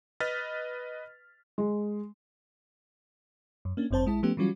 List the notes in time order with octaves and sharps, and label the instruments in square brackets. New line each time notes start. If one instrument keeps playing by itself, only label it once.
[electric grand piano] B4 D#5 F6 A6 B6
[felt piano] G#3
[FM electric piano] F#2
A#3 C#4 D4
G1 F#2 C4 C5 A5
A#1 G#3 E4 A5
F3 A3 B3 C#4 G4
E3 F#3 G3 C#4 F4 F#4